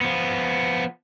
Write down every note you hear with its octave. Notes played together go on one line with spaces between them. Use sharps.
F3 B3